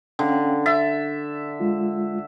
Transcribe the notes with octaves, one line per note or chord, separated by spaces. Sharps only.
D3 C#4 F5 G5
E5 A6
G#3 F4